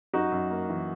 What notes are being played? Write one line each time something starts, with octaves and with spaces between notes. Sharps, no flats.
F#2 D#4 F#4
F#2
A#3
E3